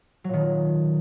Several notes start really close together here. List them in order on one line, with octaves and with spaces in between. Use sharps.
F#3 A#2 D#3